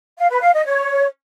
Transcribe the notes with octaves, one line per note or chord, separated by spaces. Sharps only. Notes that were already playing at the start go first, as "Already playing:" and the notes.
F5
B4
F5
D#5
C#5